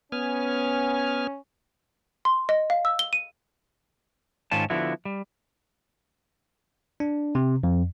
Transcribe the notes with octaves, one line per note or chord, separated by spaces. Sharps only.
B3 C#4 G#5 F6
C6
D#5
F5
E6
G7
D#7
G#2 D#3 C#4 F4 A5
D3 F3 B3 E4 F#4
G3
D4
C3
F2